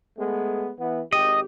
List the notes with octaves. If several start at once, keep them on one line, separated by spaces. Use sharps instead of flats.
G#3 A3 B3
E3 B3
G#1 G4 D#5